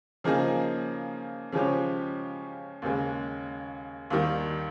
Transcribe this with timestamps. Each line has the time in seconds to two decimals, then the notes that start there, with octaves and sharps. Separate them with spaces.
0.24 C#3 F3 A#3 D#4 G#4
1.52 C#3 F3 G#3 C#4 G4
2.82 D#2 C#3 G#3
4.10 D#2 D#3 G3